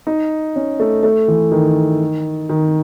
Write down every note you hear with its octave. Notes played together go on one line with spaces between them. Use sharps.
D#4
C#4
A3
A3
E3
D#3
D#3